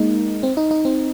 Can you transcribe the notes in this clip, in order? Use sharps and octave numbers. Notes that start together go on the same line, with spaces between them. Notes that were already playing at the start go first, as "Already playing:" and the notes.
Already playing: G#3 A#3 D#4
C4
D#4
D#4
C4